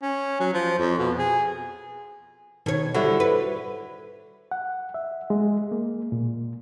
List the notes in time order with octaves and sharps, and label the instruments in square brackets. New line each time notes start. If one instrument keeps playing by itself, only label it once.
[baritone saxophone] C#4
F#3
F3
F2
B2
G#4
[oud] B2 C#5 [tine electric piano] D#3
[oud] D3 G3 [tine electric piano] E4 F#4
[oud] B4
[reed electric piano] F#5
E5
G#3
A#3
A#2